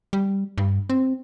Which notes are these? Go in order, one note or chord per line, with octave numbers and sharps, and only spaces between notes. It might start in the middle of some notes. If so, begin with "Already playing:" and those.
G3
G2
C4